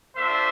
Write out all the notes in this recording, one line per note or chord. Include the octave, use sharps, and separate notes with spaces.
A3 D4 F4 C5 E5